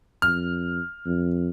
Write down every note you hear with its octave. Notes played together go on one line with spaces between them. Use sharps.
F2 F6
F2